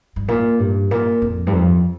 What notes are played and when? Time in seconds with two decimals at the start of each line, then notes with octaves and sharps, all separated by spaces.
0.16 G2
0.28 A#2
0.59 G2
0.91 A#2
1.22 F2
1.47 G2
1.53 F2